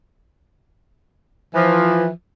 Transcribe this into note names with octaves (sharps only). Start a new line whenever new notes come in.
E3 F3